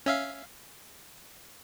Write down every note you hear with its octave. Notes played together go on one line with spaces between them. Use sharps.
C#4 E5 F5